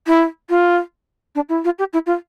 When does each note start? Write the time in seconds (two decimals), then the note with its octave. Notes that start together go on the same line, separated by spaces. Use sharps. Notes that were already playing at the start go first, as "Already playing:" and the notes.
0.07 E4
0.49 F4
1.35 D4
1.49 E4
1.64 F4
1.79 G4
1.93 E4
2.06 F4